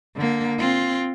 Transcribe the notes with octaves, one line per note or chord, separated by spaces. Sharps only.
D3 A#3
C4 F4